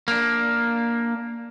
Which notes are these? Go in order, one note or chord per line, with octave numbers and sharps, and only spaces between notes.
A#3 D4